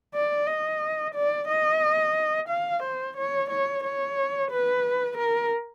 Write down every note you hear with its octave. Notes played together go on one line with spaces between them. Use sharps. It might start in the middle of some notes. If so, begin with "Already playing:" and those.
D5
D#5
D5
D#5
F5
C5
C#5
C#5
C#5
B4
A#4